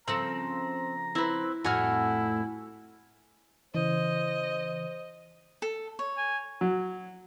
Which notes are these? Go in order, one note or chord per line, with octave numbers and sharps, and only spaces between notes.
C#3 F3 C4 A4 A#5
C4 E4 B4
F2 A2 A3 E4 F#4 G#5 F6
C#3 E3 C5 D#5
A4
C#5
G#5
F#3